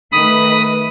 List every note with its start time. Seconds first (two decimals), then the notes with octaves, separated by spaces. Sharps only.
0.12 D#3 A3 B4 B5 D#6